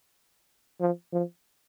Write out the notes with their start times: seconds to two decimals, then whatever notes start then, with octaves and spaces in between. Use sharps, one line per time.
0.81 F3
1.13 F3